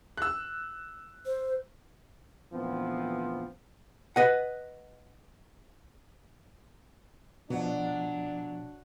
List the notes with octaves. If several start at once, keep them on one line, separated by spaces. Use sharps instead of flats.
E6 F#6
C5
D2 A#2 E3 F3 B3 C4
B4 D#5 F#5
B2 F3 F#3 D4